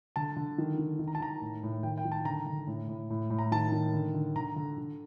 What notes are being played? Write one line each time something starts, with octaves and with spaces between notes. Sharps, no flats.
D3 A5
D3
D#3
D#3
D#3
A#5
A5
D#3 A#5
A2
A2
D#3 G5
G5
D#3
A5
D3 A#5
D3
A2
A2
A2
A2
A#5
D#3 A5
D#3
D3
D3
D3 A#5
D3
D3